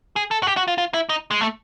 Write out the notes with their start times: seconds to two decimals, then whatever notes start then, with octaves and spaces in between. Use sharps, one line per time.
0.16 G#4
0.31 A4
0.43 F#4
0.47 G4
0.57 F#4
0.68 F4
0.78 F4
0.94 E4
1.09 D#4
1.31 G#3
1.41 A3